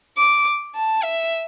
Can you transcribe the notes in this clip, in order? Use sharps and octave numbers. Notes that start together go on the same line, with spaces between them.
D6
A5
E5